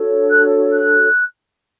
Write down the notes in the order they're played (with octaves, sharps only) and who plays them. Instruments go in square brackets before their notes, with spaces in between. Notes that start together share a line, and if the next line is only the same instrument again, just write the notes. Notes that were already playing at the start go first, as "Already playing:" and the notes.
Already playing: [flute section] D4 F#4 A4 C#5
F#6
F#6